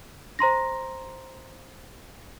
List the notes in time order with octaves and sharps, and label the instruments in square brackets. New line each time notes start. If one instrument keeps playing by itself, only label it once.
[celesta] C5 A#5 C6 A#6